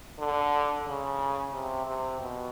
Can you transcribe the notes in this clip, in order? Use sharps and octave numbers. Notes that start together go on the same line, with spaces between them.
D3
C#3
C3
C3
B2